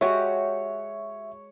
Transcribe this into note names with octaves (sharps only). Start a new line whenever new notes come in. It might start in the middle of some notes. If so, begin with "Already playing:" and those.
G#3 F#4 G4 C#5 E5